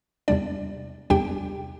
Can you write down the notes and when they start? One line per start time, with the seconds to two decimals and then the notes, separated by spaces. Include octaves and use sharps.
0.28 E2 C3 G3 D4 D5
1.10 E2 C3 G3 D4 G4 G5